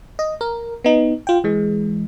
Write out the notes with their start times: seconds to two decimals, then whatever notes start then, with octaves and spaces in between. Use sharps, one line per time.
0.19 D#5
0.41 A#4
0.84 B3 D#4
1.27 F4 G5
1.44 E3 G#3